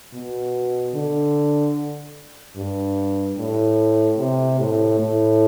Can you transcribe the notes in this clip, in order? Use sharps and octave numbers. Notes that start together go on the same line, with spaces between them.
B2
D3
G2
A2
C3
A2
A2